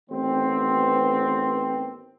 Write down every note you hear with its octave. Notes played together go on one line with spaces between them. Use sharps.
A1 D#3 B3 C4